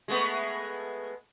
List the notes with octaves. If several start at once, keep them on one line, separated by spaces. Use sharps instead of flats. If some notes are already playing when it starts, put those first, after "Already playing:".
G#3 A3 B3